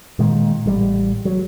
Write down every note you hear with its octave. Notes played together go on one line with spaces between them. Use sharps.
A#2 D#3 G#3
A1 G3
F#3